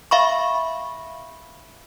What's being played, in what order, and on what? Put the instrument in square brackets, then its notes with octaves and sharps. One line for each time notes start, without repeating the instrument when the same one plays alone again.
[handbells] E5 F5 B5 C#6